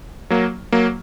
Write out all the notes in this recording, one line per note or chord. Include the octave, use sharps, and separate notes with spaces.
F#3 A#3
F#3 A#3